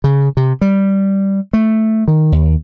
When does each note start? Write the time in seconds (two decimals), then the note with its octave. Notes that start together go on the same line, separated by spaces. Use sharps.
0.04 C#3
0.37 C3
0.61 G3
1.53 A3
2.08 D#3
2.32 D#2